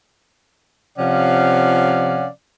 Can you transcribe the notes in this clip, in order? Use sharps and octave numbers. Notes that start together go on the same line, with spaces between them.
C3 F3 C#4 D5 F5 F#5